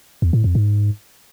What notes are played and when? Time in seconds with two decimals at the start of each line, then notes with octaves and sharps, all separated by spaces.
0.22 E2
0.33 A2
0.44 F2
0.55 G#2